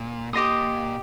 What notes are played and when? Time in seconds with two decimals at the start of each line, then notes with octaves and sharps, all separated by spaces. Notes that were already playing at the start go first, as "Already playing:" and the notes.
Already playing: A#2
0.33 A#2 G4 D#5 C6 D#6